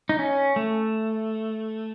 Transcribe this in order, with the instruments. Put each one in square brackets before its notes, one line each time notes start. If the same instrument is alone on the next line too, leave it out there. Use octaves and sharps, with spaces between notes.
[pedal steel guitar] D#4
C#4
A3